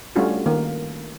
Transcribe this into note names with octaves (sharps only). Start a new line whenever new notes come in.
G3 A3 C#4 D4 F4 F#4
D#3 A#3